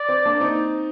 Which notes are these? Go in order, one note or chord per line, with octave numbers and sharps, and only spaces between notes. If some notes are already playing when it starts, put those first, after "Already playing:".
Already playing: D5
C4
A#3 D4
C4 D#4